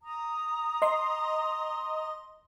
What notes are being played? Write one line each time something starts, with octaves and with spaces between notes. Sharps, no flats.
A#5 D#6
D#5 C6